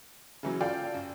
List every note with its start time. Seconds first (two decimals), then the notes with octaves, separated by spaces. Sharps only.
0.43 C#3 E3 F#3
0.60 F4 A4 D5 F5 G5
0.94 F#2